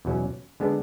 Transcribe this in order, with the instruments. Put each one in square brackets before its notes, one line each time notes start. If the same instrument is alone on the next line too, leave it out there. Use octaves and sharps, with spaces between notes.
[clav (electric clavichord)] E2 B2 F#3 C#4
D3 G#3 B3 D4